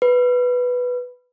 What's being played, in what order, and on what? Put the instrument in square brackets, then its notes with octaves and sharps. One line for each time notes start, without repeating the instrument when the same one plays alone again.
[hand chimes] B4